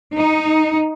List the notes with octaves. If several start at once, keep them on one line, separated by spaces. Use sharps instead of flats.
D#4